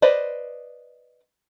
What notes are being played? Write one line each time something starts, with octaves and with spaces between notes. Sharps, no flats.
B4 C5 D5 D#5